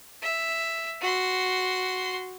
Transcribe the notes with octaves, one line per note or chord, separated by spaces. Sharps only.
E5
F#4 C6